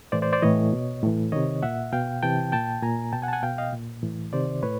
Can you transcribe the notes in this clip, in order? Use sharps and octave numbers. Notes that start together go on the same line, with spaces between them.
A2 E3 C5 D5
C5 D5
C5 D5
A2 E3 C#5 D#5
B2
A2 E3
C3 D#3 C#5 D#5
A#2 E5 F#5
B2 F5 G5
C3 E3 G5 A5
A#2 G5 A5
A#2 G#5 A#5
B2 G5 A5
F#5 G#5
A5
F#5 G#5
B2 F5 G5
D#5 F5
A#2
A2 E3
C3 D#3 C5 D5
A2 B4 C#5